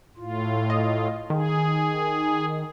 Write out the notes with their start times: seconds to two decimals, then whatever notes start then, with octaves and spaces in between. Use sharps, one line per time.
0.17 A2 F4
0.70 D#5
1.30 D#3 G#4